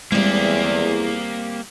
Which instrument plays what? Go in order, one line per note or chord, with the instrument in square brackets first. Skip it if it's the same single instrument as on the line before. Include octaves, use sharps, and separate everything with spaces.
[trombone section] E2 [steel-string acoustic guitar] G3 C4 [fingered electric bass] G#3 [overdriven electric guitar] A#3 G4